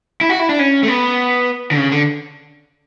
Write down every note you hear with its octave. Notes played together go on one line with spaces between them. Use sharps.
E4
F#4
E4
D4
C#4
A3
B3
D3
C#3
D3